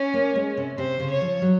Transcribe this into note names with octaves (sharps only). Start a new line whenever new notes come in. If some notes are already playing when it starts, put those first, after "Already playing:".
Already playing: C#4
A#3
G#3
C3
C3 C5
C#3
C#5
F3
F#3